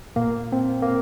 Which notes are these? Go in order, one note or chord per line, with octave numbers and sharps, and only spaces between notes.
A#2 A#3
C4
A#3